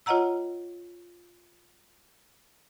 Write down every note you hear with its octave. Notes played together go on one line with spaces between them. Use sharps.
F4 C#5 D#5 F#5 A#5 E6